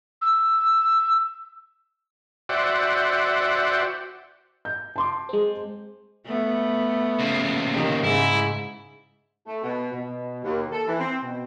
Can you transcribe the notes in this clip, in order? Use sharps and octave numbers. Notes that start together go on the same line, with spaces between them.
E6
F#4 C5 D5 E5 F#5 G5
G6
A5 C6 D6
G#3 C4
A3 B3
D#2 C#3
D#3 G4
G#2 C#3 E4
A3
B2
B2
D#2
A4
E3
C4
B2